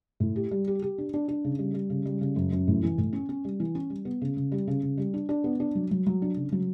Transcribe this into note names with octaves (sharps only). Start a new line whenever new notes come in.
A2
G4
G3
G4
G4
D4
D4
D4
C#3
G3
G3
C#3
G3
C#3
F#2
F#2
A2
E3
A2
C#4
C#4
G3
E3
C#4
G3
B3
C#3
C#3
G3
C#3
C#3
G3
D4
D4
B3
D4
F#3
F#3
F#3
D4
C#3
F#3